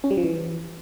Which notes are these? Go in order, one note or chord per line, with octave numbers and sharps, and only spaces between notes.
C#4
G3
F3
E3